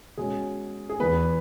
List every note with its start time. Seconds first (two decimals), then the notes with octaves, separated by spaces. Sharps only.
0.17 B2 G#3 C#4 G#4
0.90 G#4
1.00 E2 E3 B3 B4